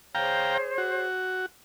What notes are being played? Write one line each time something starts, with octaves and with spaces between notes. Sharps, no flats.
G#4 C5 C#5 F5 G5 A#5
F#4